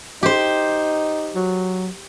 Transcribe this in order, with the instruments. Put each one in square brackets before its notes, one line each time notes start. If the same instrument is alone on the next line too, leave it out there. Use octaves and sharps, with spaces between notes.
[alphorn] D#4 [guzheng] G4 C5
[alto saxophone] F#3